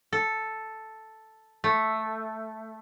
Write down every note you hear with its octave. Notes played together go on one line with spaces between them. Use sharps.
A4
A3